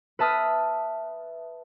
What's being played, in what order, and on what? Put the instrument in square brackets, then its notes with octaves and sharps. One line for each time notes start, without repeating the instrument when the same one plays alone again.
[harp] B4 E5 A5 D#6 F6